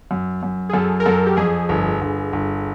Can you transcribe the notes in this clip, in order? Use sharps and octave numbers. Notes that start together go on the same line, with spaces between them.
F#2
F#2
G#4
F#2 A4
A#4
F#2 A4
G4
F2 G#4
G1
G1
G1